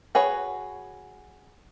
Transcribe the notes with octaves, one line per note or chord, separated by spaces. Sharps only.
F#4 G#4 B4 C#5